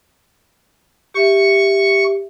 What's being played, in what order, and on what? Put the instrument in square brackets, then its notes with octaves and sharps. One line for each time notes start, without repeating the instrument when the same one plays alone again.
[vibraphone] G4 E5 [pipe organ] C#6